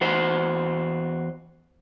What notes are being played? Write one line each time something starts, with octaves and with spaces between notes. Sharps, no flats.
E2 F#4 C5